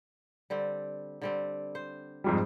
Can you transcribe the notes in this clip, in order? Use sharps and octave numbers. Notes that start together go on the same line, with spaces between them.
D3 G3 C4
D3 G3 C4
C5
F2 G#2 G3